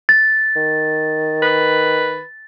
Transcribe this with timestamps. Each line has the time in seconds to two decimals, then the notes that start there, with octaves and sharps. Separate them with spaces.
0.09 A6
0.56 D#3
1.43 B4